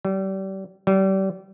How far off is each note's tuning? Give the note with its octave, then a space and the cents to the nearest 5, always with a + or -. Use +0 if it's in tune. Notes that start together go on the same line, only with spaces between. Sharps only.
G3 -30
G3 -30